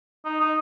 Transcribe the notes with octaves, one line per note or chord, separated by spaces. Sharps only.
D#4
D#4